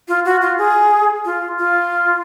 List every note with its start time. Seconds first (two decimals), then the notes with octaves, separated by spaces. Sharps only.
0.08 F4
0.25 F#4
0.41 F4
0.58 G#4
1.25 F4
1.58 F4